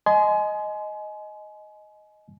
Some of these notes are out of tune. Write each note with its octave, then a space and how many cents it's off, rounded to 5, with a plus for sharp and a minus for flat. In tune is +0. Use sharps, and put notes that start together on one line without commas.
D#5 +0 G#5 +30 C6 -25